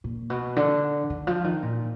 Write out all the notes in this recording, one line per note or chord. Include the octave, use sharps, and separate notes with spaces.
A#2
B2
D3
D#3
F3
D#3
A#2